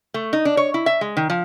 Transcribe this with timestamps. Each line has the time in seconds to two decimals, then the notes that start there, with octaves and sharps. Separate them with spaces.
0.14 A3
0.33 D#4
0.45 D4
0.57 C#5
0.74 E4
0.86 E5
1.01 G#3
1.17 D#3
1.30 F3